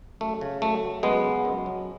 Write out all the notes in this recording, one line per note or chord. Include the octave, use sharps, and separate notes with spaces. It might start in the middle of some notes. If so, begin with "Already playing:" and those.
F#2 A3
C#3
F#2 A3
F#3
F#2 G#3 B3
C#3
F#2
F#3